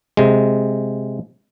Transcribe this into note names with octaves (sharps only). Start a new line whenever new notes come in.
C3 G#3